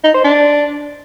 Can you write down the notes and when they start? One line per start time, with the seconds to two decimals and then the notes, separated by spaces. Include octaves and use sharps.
0.04 D#4
0.14 C5
0.24 D4